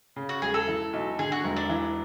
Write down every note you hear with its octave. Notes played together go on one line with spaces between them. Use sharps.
C#3
F#4
E1 G#4
A4
E3
B1
D3 G#4
F#4
E1
D4
E3